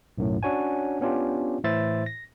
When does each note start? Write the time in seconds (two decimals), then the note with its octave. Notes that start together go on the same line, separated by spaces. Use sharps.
0.18 B1 F#2 A2
0.43 C#4 D4 F#4 C#5 F#5 G#5
1.01 B3 C#4 D4 F4 G4
1.64 A2 E3 E4 C5 E5 A6
2.06 A#6